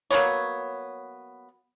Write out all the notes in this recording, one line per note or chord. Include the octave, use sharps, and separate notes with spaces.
F#3 A#3 B3 C#5